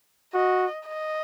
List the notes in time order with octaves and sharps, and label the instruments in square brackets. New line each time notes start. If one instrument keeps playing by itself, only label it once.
[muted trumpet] F#4 [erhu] D#5
[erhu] D#5